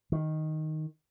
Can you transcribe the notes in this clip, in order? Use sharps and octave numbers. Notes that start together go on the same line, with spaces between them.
D#3